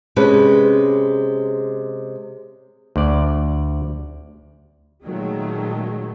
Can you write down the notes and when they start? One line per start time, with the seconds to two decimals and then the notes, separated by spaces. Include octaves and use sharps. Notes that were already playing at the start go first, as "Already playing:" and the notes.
0.16 C3 G#3 C#4 B4
2.96 D2 D5
5.04 A#2 D#3 F#3 G#3 A3